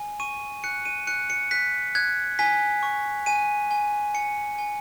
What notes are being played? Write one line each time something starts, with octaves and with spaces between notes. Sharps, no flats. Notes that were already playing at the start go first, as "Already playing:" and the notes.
Already playing: G#5
C#6 D#7
F#6 C#7
D#7
F#6 C#7
C#7
F#6 B6
F#6 G#6
G#5 B6
C#6
G#5 D#7
G#5
G#5 C#7
G#5